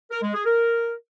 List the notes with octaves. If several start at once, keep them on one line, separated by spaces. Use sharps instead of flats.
A#4
G#3
G#4
A#4